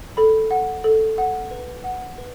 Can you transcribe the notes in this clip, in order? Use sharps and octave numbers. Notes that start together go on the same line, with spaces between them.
A4 B5
F#5
A4
F#5
B4
F#5
B4